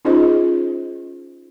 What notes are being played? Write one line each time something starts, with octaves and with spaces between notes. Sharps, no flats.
C#4 D#4 F4 G#4 C5 D#5